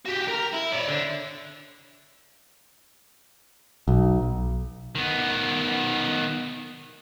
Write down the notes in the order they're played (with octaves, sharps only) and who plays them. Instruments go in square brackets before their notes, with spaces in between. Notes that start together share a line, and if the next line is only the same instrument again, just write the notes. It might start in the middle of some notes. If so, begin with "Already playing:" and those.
[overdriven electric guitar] F#4 G4
A#4 A#5
E4
C#5 D5
D3
[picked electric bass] B1
[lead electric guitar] D#3 B3